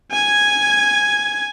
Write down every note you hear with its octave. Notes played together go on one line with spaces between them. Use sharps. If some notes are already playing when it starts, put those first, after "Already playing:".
G#5 G#6